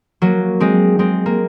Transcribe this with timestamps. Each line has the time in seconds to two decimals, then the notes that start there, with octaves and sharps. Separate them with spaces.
0.22 F#3 A#3
0.60 G#3 C4
0.99 G#3 C4
1.26 A#3